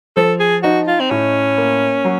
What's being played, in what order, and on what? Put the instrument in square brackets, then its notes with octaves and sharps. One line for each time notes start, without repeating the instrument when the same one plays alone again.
[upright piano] F3 [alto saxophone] A4
[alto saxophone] G#4
[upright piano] D#4 [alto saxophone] F#4
[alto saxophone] F4
C4
[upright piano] A2 [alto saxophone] C#4
[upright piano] A#3
F#3